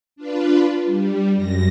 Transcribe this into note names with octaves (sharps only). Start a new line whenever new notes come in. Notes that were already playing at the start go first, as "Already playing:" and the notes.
D4 F4 B4
G3
F#2 A#6